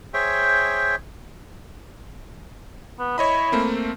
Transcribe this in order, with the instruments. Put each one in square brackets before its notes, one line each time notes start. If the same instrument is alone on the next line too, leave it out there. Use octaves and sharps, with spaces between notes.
[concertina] G#4 C5 C#5 E5 G5
[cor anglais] B3
[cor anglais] E4 [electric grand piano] C#5 D#5 B5
[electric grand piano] A3 A#3 C4